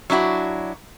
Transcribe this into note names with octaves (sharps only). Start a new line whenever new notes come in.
F#3 D4 E4 F#4